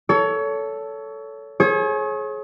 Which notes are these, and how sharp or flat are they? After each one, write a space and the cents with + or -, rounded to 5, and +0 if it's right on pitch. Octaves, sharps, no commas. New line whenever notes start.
A4 +0 C#5 +25
G#4 +30 C#5 -35